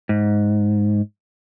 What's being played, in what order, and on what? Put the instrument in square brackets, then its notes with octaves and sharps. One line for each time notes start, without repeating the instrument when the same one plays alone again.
[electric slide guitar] G#2